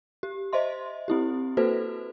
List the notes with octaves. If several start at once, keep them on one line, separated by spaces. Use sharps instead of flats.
G4
C5 D#5 E5 C6
C4 E4 G4
A#3 F#4 A4 B4 C5